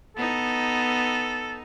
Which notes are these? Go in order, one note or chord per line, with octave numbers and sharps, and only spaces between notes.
B3 D#4 A4